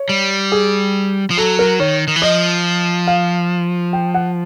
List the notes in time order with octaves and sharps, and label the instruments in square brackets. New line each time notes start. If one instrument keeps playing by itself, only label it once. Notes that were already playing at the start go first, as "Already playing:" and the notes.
Already playing: [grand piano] C#5
[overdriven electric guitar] G3
[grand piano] G#4
[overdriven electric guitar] F3
[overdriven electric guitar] F#3 [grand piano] A4
[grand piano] A#4
[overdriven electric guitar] D#3 [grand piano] C#5
[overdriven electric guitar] D#3
E3
[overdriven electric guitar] F3 [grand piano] D#5
[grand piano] F5
G5
F#5